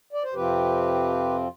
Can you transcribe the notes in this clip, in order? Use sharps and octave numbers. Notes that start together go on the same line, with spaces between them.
D5
C5
F2 C3 F3 C4 F4 G4 B4